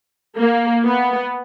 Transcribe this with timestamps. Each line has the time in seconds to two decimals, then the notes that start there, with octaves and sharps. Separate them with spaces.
0.38 A#3
0.84 B3